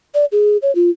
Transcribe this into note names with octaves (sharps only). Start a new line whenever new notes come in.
D5
G#4
C#5
F4